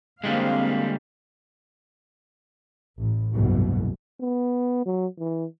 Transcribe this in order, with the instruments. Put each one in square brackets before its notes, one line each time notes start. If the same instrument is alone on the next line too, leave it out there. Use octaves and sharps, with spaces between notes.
[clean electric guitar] D3 G3 G#3 [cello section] A#3 C4 F5
[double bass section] A1
F#1 C2 G#2 B2
[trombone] B3
F#3
E3